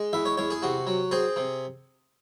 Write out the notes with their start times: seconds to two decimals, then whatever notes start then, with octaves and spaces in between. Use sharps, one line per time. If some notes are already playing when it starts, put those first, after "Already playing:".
Already playing: G#3
0.13 E2 E5
0.25 C#5
0.37 E2 C#5
0.50 G#4
0.62 C3 F#4
0.87 F#3
1.11 C4 G#4
1.36 C3